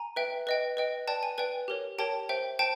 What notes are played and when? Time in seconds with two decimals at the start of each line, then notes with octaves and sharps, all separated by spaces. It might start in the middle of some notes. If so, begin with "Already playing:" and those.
Already playing: G#5 A#5
0.16 B4 E5 G5
0.47 B4 D#5 G5
0.77 B4 D#5 G5
1.08 B4 D5 G5 A5
1.23 G#5
1.38 B4 D5 G5 G#5
1.68 G4 A#4 C#5
1.98 G4 A#4 C#5 G5 A5
2.29 C5 E5 G5
2.59 C5 G5 A5